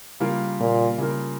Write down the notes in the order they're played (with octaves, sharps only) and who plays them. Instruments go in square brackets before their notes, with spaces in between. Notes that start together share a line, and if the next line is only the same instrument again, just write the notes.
[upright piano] C#3 G3 A#3 F4 A#4
[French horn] A#2
[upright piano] C#3 G3 A#3 F4 A#4